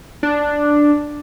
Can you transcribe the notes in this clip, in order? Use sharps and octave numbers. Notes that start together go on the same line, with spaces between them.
D4